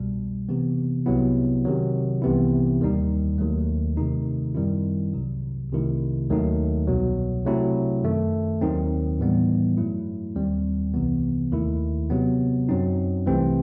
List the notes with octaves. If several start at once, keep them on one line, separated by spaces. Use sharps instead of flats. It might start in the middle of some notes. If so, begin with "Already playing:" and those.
Already playing: C2 B2 G3
C3 E3 B3
C2 C3 F#3 B3 E4
C3 D#3 F#3
C2 C3 E3 B3 E4
D#2 D#3 G3 D#4
D#2 D#3 F#3 A3
C3 D#3 A3 D#4
F#2 D#3 G3 C4 E4
C2 C3 F#3
C2 C3 D#3 A3 E4
D#2 D#3 F#3 A3 D#4
C2 B2 F#3
C3 F#3 A3 C4 E4
F#2 D#3 A3
D#2 D#3 F#3 C4 D#4
A2 E3 G3 B3 D#4
G2 F#3 A3 E4
D#2 D#3 G3 C4
C2 C3 E3 B3
D#2 D#3 A3 E4
C3 F#3 B3
F#2 F#3 C4 D#4
C2 C3 E3 A3 C4